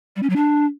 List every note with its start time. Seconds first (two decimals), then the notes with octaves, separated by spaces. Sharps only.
0.16 G3
0.23 C#4
0.29 F#3
0.36 D4